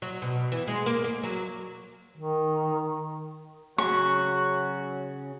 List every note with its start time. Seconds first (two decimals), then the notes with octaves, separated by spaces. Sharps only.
0.02 F#3
0.22 B2
0.52 E3
0.68 G#3
0.86 A#3
1.04 A#3
1.23 F#3
2.16 D#3
3.78 C#3 F#3 C#4 F#4 C#6